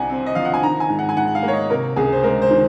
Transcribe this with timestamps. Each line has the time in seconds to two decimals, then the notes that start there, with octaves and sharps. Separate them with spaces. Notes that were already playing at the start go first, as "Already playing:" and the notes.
Already playing: C2 C3 F#5 G#5
0.10 C4
0.26 D#5
0.35 F3 F5
0.45 F#5
0.54 G#5
0.63 D#3 A#5
0.80 G#5
0.89 G#2
0.99 F#5
1.09 G#5
1.17 G#2 F#5
1.35 F5
1.43 A#3
1.48 C#5
1.53 D#5
1.70 C3 A#4
1.96 C#2 G#4
2.13 C5
2.23 G#3 A#4
2.42 C5
2.51 D#3